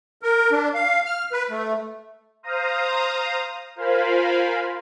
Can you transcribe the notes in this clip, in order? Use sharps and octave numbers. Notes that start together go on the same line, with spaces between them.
A#4
D4
F5
F6
B4
A3
C5 F5 A#5 D#6
F4 A#4 C5 F5 G#5 B5